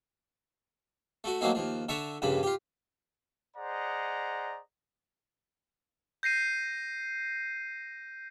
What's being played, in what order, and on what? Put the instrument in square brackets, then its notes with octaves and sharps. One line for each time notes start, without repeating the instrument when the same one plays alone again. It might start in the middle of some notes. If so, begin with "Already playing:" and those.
[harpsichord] A3 F#4
F#3 A3 A#3 C4 D#4
D#2 F3
D3 E5 A5 A#5 C#6
A#1 G2 C#3 B5
F4 G4
[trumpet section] G#4 C5 D5 D#5 F#5 A#5
[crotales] G6 A#6 C7 D#7